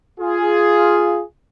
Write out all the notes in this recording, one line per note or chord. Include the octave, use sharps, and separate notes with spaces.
F4 G#4